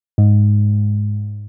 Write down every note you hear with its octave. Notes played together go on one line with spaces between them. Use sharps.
G#2